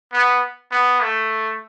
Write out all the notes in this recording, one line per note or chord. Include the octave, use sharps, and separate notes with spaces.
B3
B3
A3